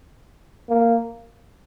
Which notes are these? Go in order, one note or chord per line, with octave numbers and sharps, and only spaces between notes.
A#3